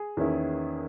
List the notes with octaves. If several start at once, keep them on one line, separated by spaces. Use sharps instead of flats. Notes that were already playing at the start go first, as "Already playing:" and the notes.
Already playing: G#4
E2 D#3 A#3 C#4 E4